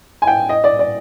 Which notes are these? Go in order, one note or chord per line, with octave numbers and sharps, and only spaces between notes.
G#5
G5
D#5
D5
D5